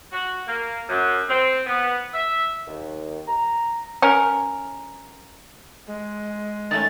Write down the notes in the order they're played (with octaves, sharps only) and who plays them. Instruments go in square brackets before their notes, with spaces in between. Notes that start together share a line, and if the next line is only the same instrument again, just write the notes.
[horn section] F#4
A#3
F#2
C4
B3
E5
[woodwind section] D#2
A#5
[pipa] C#4 A#4
[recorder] G#3
[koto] D#3 A3 C#4 [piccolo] A6